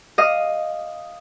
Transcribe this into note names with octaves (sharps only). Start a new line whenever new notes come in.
D#5 F5 D#6